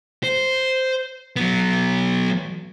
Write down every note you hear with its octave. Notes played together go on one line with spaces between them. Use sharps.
C5
F#3 B3